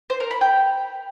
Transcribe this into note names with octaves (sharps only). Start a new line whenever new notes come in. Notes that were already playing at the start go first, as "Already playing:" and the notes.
C5
A#4
B5
G5